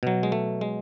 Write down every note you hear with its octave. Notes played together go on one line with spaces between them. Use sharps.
B2 F#3
G#3
A3
G#3